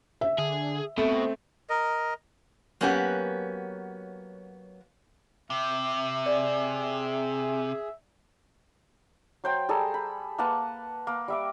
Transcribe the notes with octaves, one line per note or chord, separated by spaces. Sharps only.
E5
D3 G#4
B2 A3 C4
A#4 D#5
F#3 A#3 B3 C#4 F#4 G4
C3 E5
G#4 D5
F#3 C5 G5
G3 G#4 A4 A#5
B5
A#3 B4 F#5 A5
A#3
G3 E5 D6